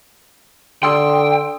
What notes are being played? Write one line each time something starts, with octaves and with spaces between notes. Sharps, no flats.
D3 G5 C6 D#6 E6